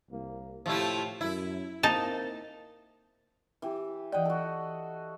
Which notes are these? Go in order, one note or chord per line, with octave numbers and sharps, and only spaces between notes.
C2 A#3
A2 C3 F3 A3 E4 G4
F#2 E4
A#3 C4 D#4 A5
E3 G4
E3 D5 D#5 F#5 G5
F#4 A4